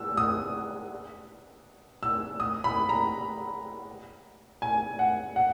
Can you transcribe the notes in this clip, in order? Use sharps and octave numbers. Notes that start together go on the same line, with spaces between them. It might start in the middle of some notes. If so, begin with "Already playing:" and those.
Already playing: E6
D#6
E6
D#6
B5
A#5
G#5
F#5
F#5